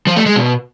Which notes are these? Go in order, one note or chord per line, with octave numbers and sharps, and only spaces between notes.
F3
A3
G#3
B2